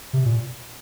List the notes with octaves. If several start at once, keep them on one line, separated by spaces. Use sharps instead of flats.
C3
A#2